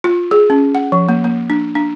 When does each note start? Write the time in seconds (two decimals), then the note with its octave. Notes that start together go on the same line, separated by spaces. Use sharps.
0.04 F4
0.31 G#4
0.50 C#4
0.75 F#5
0.92 F3
1.09 A#3
1.24 A#3
1.50 D4
1.75 D4